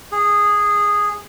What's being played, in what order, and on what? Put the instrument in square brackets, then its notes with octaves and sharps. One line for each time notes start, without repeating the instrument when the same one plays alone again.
[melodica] G#4